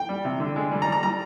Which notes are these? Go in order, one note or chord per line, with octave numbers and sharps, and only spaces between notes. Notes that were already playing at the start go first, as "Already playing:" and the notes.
Already playing: G5
G3
C3
D3
G#3
G3
A#5
G3
A#5
G3 A#5